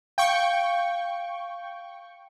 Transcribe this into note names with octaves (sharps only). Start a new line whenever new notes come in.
F5 G5 C#6